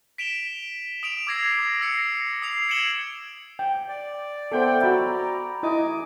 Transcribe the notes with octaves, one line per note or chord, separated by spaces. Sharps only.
B6 D7 E7 F7 G7
D#6 D7 F7
D6 E6 G#6 A#6 C7 D7
E6 A#6 C7 C#7
D#6 C7 F7
G#6 C#7 D7 E7 F#7 G7
G5
D5
B3 A4 C5 E5 F#5 G5
F#4 E5 A#5 B5
E4 D#5 G#5 D6